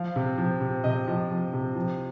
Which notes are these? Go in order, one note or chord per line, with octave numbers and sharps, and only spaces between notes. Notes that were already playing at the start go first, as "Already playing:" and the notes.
Already playing: F3 F5
C3
F3
C3
C3 D#5
F3
F3
C3
F3